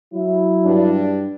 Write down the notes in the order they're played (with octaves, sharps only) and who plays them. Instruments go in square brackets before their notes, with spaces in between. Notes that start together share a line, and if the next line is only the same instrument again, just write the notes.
[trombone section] F#3 E4
[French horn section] G2 D4